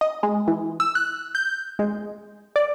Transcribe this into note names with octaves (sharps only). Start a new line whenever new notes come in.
D#5
G#3
E3
E6
F#6
G6
G#3
D5